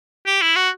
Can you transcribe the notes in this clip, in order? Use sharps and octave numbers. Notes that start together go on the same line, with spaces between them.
G4
E4
F#4